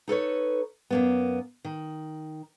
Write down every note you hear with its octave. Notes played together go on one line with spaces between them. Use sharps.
D#4 A4 B4 C#5
F#2 A#3 B3
D#3